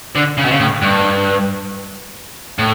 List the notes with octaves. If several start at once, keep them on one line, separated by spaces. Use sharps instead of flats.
D3
C#3
B2
C#3
A2
G2
A2